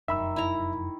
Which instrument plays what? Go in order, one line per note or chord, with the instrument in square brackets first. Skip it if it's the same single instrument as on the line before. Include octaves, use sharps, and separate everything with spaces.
[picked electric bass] F1 F#2 [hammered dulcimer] D#3 [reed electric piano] E5 B5 E6
[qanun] E4 A#5